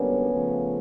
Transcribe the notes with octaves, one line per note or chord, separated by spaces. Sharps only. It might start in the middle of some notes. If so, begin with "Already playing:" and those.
Already playing: F#2 D3 G3 A#3 B3 C#4
C#3 F3 A3